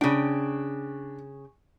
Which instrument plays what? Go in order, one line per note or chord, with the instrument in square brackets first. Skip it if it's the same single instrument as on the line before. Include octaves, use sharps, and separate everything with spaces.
[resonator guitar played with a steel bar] C#3 G5 [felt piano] D4